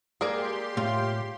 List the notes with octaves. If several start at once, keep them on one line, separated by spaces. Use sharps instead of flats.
G#3 A#3 G4 G#4 A#4 D5 C6
A2 F4